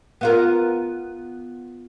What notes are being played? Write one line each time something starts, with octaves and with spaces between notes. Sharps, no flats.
B3 F4 A#4